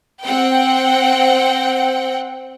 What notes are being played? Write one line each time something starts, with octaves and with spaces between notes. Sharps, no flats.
C4 F#5 G5